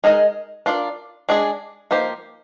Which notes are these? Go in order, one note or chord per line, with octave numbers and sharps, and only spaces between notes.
G#3 D#4 A#4 D#5
D4 F4 A#4 D5
G#3 D4 G#4
F3 A#3 D#4 G4 C5